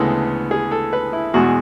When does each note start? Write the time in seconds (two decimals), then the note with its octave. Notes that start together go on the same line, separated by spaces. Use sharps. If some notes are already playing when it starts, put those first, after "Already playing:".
Already playing: D2 C#3 E3 G#3 B3 A4
0.51 G#4
0.71 A4
0.93 B4
1.13 E4
1.34 E2 B2 G#3 F#4